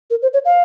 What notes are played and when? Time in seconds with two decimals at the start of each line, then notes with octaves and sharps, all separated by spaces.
0.10 A#4
0.22 C5
0.33 C#5
0.45 F5